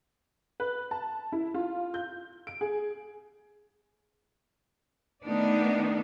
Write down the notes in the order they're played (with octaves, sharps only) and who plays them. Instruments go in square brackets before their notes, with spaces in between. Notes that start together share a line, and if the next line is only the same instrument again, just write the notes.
[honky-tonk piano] B4
A5
E4
F4
G6
D7
G#4
[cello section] D#3 A3 B3 D4 D#4